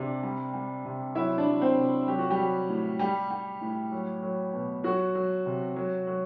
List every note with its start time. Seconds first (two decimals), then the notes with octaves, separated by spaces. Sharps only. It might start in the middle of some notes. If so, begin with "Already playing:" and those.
Already playing: C3 D4 D5
0.23 G3
0.54 G3
0.85 C3
1.15 F#3 E4 E5
1.38 D4 D5
1.47 F#3
1.62 C4 C5
1.77 C3
2.08 F#3 G4
2.19 F#4
2.31 G3 G4
2.39 F#3
2.69 A2
2.99 G3 G4
3.31 G3
3.61 A2
3.92 F#3
4.23 F#3
4.54 B2
4.84 F#3 F#4
5.15 F#3
5.46 C3
5.76 F#3
6.07 F#3